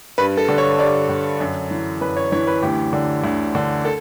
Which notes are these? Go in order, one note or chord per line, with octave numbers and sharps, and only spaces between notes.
G2 B4
A4
D3
C#5
G2 D5
D3
F#2
E3
F#2 B4
C#5
E3 C#5
B4
D2 G4
D3
D2
D3
A4